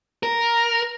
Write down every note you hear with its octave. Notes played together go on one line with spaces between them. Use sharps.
A#4